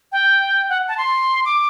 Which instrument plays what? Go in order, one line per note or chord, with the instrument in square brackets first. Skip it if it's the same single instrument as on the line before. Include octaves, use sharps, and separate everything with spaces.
[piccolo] G5
F#5
A5
C6
D6